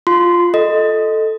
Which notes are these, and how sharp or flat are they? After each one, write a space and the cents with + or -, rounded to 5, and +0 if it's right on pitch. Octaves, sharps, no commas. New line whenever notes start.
F4 +0 C6 -15
A4 +0 D#5 +0